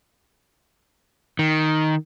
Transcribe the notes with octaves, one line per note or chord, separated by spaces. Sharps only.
D#3